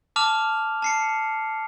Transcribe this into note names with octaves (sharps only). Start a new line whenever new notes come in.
A5 D6 F6 F7
A5 C7 C#7